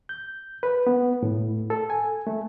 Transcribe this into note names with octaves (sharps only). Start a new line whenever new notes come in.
G6
B4
B3
A2
A4
G#5
A3